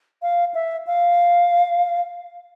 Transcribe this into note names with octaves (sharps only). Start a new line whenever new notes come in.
F5
E5
F5